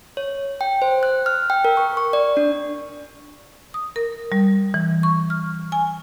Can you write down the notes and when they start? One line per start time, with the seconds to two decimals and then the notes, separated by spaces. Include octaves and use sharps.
0.17 C#5
0.61 G5
0.82 C5
1.03 F#6
1.26 F6
1.50 G5
1.65 A#4
1.77 C#6
1.97 C#6
2.13 D5
2.37 D4
3.74 D#6
3.96 A#4
4.32 G3
4.74 E3
5.03 C#6
5.30 F6
5.72 G#5